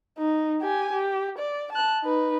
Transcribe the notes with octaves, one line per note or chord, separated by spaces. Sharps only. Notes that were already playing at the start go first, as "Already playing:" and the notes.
D#4
G4 G#5
G4
D5
A5 F#6
D#4 B4